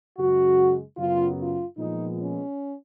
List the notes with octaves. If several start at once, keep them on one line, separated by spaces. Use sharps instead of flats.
F#2 C#3 G#3 F#4
F#2 C#3 F#3 B3 F4
F4
A#2 F3 G#3 B3 D#4
C#4